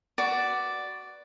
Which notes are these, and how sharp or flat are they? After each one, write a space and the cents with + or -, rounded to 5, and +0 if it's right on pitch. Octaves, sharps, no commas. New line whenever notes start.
F#4 +15 B4 +0 D5 +0